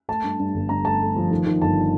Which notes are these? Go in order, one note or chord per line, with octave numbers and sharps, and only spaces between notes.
A3 A5
G2
G2
G1
G2 A#5
A3 A5
A3
F3
D#3
D#3
G1 A5